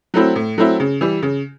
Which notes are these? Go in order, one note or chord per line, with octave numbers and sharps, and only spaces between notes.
F#3 A3 C4 E4
A2
F#3 A3 C4 E4
C#3
E3 G3
C#3